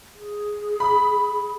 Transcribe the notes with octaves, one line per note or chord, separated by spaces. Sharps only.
G#4
B5